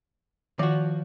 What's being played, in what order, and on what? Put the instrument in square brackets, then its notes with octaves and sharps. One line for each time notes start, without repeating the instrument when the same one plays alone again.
[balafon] D#3 [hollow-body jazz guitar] F3 F#4